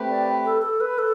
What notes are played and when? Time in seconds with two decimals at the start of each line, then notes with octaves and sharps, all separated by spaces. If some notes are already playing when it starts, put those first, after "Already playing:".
Already playing: A3 C4 G4 B4
0.10 D5
0.45 A4
0.62 A4
0.81 B4
0.98 A4